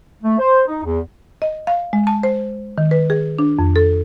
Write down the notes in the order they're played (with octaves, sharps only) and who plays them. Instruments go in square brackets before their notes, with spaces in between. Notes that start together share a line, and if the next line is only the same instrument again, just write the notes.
[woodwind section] A3
C5
D#4
E2
[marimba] D#5
F5
G#3
A5
C5
D#3
B4
G#4
D4
F2
A4